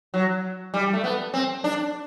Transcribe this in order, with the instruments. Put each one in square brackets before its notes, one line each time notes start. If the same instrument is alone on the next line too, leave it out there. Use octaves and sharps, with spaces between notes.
[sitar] F#3
G3
A3
B3
C4
D4